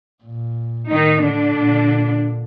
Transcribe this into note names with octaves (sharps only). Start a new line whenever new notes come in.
A#2
A2 D#3 D#4
D3 D4
A#2